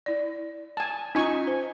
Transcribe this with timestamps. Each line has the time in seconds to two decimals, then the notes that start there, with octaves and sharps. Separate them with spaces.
0.06 E4 D5
0.77 G#5 A5
1.15 C#4 D#4 F4 G#5 C#6
1.47 C5